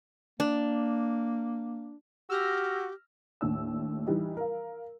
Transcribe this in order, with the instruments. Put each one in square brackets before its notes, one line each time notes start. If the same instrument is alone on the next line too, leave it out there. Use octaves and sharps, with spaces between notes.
[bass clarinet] A#3 [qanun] D4
[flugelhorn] F#4 [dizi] G4 [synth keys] E6 F6 A#6
[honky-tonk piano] D#2 A2 D4 E6
E3 G3 D#4
A#4 F5